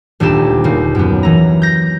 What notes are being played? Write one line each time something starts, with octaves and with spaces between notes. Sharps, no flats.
D#1 D2 D4 G4 E7
D#2 C#3 A#3
F#2 B3
E3 A#5
G6 A#6